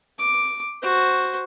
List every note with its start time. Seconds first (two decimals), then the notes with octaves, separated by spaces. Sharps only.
0.19 D6
0.82 F#4 C5